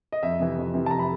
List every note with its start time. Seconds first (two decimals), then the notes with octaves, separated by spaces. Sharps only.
0.12 D#5
0.23 F2 E5
0.40 C3 E3
0.58 F2
0.74 C3 E3
0.86 A5
0.91 F2 A#5
0.99 B5